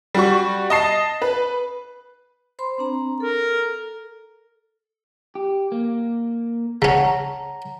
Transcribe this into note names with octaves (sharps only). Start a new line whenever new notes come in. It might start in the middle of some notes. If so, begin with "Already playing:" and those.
G3 F#4 C#6
D#5 A5 C7
B4
C5 B5 C6
C4 D4 A#5
A4 A#4
G4
A#3
C#3 C#4 C#5 F#5 A5 A#5
A#5